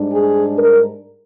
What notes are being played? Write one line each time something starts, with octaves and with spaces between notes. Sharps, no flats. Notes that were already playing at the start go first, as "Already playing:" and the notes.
Already playing: G#2 G3 D4
G#4
A#4